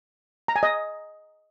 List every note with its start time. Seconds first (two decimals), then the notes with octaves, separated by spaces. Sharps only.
0.48 A#5
0.56 G#5
0.63 D#5